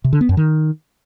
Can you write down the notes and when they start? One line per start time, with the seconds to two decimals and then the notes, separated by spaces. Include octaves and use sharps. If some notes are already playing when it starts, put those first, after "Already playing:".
0.04 C3
0.13 D3
0.21 B3
0.29 F#2
0.37 D#3